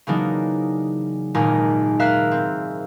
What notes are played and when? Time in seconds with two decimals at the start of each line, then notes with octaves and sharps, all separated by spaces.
0.07 C#3 E3 F#3 A#3 D4 D#4
1.34 G#1 D#2 A#2 D#4 A#4 G#5
1.99 A#4 E5 F5 A#5 E6 F#6
2.31 C4